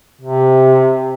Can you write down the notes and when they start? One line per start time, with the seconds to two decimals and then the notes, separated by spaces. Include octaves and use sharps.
0.22 C3